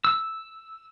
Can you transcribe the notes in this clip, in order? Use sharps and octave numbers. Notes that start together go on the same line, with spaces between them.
E6